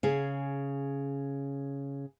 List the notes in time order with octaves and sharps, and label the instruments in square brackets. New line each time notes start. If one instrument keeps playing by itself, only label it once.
[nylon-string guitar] C#3 G#4